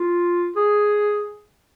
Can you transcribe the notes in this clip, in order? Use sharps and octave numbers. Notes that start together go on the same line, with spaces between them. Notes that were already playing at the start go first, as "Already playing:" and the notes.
Already playing: F4
G#4